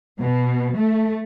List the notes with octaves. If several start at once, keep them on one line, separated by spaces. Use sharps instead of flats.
B2
A3